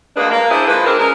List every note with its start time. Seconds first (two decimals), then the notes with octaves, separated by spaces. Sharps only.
0.16 D2 G#3 A#3 D4 B4
0.30 A#3
0.51 D4 E4 G#4 C5
0.67 F3 G#3 A#3 B4
0.85 G#3 C4 D4 A#4
0.99 C#4 G#4 A#4